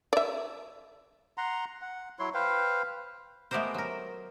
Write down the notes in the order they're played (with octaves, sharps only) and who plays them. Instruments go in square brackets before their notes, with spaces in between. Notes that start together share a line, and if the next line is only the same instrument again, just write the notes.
[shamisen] D5 E5
[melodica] F#5 A#5 C6
F#5
F#3 E4 C#5 C6
B4 C5 F5 G5
[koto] G#3 A3 B3 G4 A#4 C5
F#3 A#4